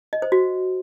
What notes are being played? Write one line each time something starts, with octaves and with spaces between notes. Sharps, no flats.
D#5
C5
F#4